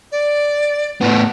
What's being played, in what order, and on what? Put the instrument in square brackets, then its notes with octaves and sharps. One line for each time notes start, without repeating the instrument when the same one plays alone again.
[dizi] D5
[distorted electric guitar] A2 B3